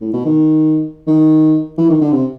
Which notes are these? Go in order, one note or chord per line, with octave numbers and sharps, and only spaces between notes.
A2
B2
D#3
D#3
E3
D#3
D3
C3